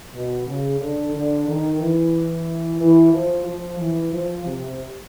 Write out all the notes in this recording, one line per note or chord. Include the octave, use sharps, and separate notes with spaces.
B2
C#3
D3
D3
D#3
E3
E3
F3
F3
E3
F3
C3